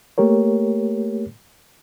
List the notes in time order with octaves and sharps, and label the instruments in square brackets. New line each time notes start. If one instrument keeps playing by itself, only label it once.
[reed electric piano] A3 A#3 G4 A#4 C#5